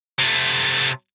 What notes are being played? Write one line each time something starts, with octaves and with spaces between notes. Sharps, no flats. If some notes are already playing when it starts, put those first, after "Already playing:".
C3 A3